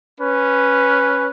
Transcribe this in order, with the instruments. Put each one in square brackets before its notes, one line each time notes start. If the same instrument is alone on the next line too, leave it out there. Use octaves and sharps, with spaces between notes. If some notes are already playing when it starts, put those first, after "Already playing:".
[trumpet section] C#4 B4